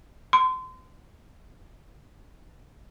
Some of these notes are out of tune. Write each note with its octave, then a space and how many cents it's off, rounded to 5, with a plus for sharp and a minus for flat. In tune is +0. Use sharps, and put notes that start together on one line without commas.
C6 -30